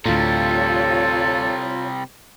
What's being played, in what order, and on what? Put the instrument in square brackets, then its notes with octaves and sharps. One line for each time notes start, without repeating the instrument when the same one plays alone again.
[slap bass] D2 A2 [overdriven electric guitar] C3 G3 [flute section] F4 C#5 [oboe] A4